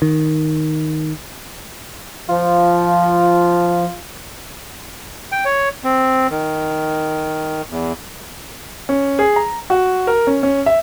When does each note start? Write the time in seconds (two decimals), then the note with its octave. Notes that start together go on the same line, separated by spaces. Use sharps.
0.02 D#3
2.29 F3 F4
5.32 G5
5.45 C#5
5.84 C4
6.30 D#3
7.70 E2
8.89 C#4
9.19 G#4
9.36 A#5
9.70 F#4
10.07 A#4
10.27 C#4
10.43 C#4
10.66 E5